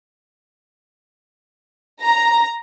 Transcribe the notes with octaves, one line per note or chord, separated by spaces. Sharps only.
A#5